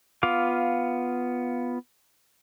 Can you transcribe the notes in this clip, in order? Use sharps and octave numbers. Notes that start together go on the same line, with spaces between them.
B3 F4 F5 D6